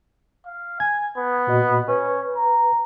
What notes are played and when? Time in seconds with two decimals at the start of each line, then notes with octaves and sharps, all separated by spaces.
0.46 F5
0.80 G#5 G#6
1.17 B3
1.47 A#2 F#4 D#5
1.88 C#4 B4
2.36 A#5